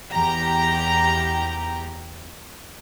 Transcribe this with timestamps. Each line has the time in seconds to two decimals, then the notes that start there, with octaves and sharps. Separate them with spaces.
0.12 E2 G4 A#5